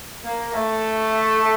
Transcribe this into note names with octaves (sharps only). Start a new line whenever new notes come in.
A#3
A3